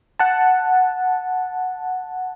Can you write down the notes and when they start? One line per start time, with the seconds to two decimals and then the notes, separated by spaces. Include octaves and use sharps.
0.19 F#5 A5